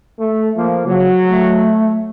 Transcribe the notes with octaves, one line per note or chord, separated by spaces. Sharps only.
A3
F3 A#3
C#3 F#3
A3